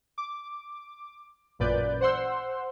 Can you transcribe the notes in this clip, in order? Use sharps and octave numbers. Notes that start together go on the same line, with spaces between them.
D6
A1 F#2 A#2 B4 D5 G6
C5 F#5 C6 E6